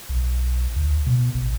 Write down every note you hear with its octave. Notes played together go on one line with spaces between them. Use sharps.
B1
D2
B2
A1